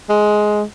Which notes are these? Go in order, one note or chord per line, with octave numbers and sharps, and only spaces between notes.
G#3